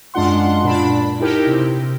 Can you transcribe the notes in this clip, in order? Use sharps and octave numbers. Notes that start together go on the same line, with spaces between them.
F#2 G#3 D4 F4 F#5 C6
A#2 D4 A5 B5
D#4 E4 G4 A#4
C3